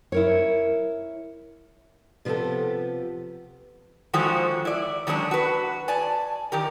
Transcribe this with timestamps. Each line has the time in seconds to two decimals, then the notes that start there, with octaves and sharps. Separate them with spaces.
0.12 E4 A#4 C#5
2.25 C3 F3 B3 G4 A4
4.13 D3 D#3 F3 G#3 F#4
4.65 E4 D5
5.07 D#3 F#3 G#3 C#4 D4
5.31 F#4 B4
5.88 D5 G#5 A5
6.52 D#3 G4 A#4